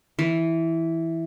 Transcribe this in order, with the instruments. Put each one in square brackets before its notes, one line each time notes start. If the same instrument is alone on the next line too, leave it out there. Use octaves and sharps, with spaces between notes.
[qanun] E3